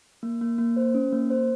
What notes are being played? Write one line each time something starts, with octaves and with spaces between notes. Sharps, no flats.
A#3
A#3
A#3
C5
C#4
A#3
C5